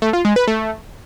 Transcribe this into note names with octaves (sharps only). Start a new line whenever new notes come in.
A3
F4
G#3
B4
A3